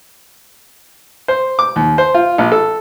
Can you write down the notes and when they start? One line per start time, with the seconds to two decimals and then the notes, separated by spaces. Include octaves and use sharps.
1.28 C5
1.59 D6
1.76 D#2
1.98 C5
2.15 F4
2.38 A#1
2.52 A4